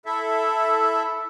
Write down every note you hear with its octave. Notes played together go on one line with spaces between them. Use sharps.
E4 A4 E5